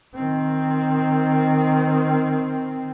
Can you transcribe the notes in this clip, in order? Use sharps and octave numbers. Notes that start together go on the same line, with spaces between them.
D#3 C4